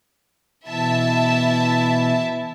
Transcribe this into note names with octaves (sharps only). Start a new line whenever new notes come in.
B2 E3 E4 E5 A5